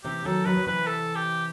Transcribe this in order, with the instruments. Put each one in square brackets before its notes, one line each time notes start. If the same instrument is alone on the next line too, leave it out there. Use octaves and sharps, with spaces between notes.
[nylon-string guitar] C3 E3 [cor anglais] G4
[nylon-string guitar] D#3 F#3 [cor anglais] A4
[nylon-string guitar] D#3 F#3 [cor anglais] B4
[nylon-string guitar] F#3
[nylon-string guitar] C3 E3 [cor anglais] B4
[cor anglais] A4
G4